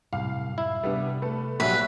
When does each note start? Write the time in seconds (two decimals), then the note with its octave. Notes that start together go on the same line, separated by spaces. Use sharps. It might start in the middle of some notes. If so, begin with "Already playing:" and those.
0.13 C2 F#2 A2 F5
0.58 E4
0.83 C3 G3 B3 D4
1.22 A3 A4 B4
1.60 A#1 F#3 G3 B4 E5 C#6